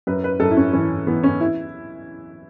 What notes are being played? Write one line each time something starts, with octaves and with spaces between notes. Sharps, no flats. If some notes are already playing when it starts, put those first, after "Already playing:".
F#2 B4
B4
F#2 A4
E4
C#4
E3 C#4
E3 B3
C#4
E4